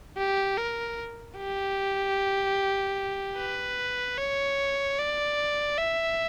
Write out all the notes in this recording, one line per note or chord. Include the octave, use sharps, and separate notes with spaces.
G4
A#4
G4
B4
C#5
D5
E5